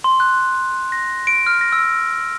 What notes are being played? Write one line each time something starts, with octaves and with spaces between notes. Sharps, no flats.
C6
F#6
A#6
D7
F6
A#6
E6